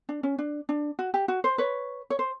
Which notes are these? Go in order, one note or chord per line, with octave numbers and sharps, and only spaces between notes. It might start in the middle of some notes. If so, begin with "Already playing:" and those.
D4
C#4
D4
D4
F#4
G4
F#4
C5
B4 C#5
C#5
C5